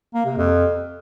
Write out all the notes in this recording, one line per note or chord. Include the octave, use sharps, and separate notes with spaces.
A#3
C3
F2